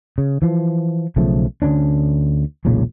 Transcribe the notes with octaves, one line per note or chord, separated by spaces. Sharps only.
C#3
E3 F3
B1 C#3 F3 A3
D2 D3 C#4 D4
E1 B1 A#2 C#3